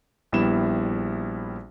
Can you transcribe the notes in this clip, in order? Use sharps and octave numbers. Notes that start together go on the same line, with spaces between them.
A#1 G3 B3 E4 E7